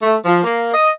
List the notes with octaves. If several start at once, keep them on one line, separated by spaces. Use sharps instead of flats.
A3
F3
A#3
D#5